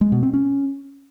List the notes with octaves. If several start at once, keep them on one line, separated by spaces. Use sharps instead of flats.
G#3
B2
C4
C#4